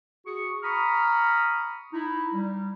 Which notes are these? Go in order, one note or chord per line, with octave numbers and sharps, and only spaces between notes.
F#4 G#4 C#6
A#5 B5 C#6 D#6 F6
D#4 E4
G3